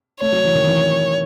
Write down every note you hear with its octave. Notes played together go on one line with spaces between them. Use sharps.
A3 C#5
F#3
E3
D#3
E3